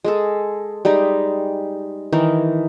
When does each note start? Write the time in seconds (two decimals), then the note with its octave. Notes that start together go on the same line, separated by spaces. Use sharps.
0.05 G#3 G#4 A4
0.85 G3 G#3 D#4 G4
2.12 D#3 E3 D#4